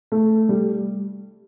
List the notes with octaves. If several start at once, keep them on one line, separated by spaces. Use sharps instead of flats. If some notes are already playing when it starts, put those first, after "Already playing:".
A3
G3